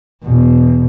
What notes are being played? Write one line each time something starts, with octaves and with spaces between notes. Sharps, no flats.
E2 B2